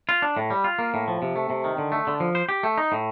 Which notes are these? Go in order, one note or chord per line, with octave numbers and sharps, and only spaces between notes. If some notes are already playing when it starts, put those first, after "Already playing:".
F4
D4
A2
G3
F4
A#3
A2
F3
C3
A3
C3
D#3
D3
A3
D3
F3
C5
G4
A3
D#4
A2